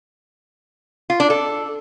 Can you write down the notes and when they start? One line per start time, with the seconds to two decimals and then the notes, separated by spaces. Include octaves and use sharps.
1.10 F4
1.20 D4
1.30 A4